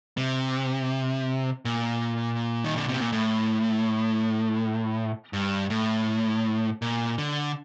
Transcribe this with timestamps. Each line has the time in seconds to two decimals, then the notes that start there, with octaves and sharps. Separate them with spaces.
0.17 C3
1.65 A#2
2.64 D#3
2.76 D3
2.89 C3
3.00 A#2
3.12 A2
5.33 G2
5.70 A2
6.82 A#2
7.18 D3